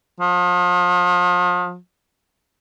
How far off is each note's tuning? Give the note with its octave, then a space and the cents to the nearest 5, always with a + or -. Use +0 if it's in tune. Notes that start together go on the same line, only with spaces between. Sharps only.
F3 +35